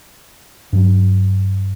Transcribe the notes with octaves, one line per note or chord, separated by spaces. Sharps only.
G2 F#3